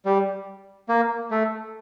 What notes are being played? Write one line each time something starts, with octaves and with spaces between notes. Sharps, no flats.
G3
A#3
A3